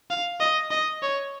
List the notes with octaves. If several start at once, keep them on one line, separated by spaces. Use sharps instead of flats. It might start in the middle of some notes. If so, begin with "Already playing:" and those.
F5
D#5
D#5
C#5